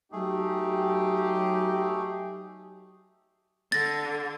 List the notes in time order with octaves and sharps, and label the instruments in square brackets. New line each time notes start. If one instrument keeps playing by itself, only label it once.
[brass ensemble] F#3 D#4 G4 [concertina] A3 G#4
[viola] D3 [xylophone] A6 A#6